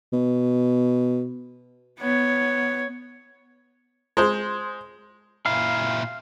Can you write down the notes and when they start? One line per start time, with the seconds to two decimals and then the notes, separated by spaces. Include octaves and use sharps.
0.13 B2
2.00 B3 C#5
4.17 G#3 C5
5.46 A#2 E4 F5